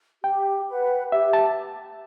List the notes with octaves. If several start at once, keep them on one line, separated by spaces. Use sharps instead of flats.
G4 G5
B4 F#5
G4 E5
A5